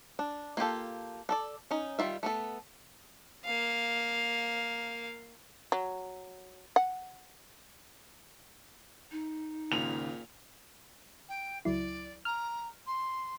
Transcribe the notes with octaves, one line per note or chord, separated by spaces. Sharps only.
D4
A#3 F4 G4 A4
D4 A4 D5
C#4 D#4
D#3 G3 F4 E5
A3 B3 A4
A#3 F5
F#3
F#5
D#4
G#1 C#2 A#2 F7
G5
C#2 F#3 E4 D5
A#5 F6
C6